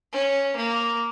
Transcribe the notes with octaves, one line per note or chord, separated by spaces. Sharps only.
C#4
A#3